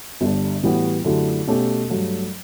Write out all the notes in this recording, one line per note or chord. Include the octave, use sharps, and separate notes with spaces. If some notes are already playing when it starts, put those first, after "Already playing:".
G1 G2 D3 G3 D4
A2 E3 G3 B3 F#4
F#2 D3 A3 E4 G4
B2 A3 C#4 G4
G2 F#3 A3